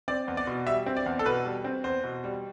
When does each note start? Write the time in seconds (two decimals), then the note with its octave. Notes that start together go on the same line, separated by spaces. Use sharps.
0.08 C4 D5
0.28 E2
0.37 D5
0.47 B2
0.66 G3 E5
0.86 C4
0.97 D5
1.06 E2
1.19 A4
1.25 B2 B4
1.45 G3
1.64 C4
1.84 E2 C5
2.04 B2
2.24 G3